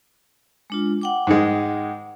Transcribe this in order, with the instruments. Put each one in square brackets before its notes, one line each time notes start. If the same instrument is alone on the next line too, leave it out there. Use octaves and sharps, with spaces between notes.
[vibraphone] G#3 D4 F4
F#5 G5 D6
[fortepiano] G#2 D#3 G#3